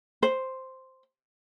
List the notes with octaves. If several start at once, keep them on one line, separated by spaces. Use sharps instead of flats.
C5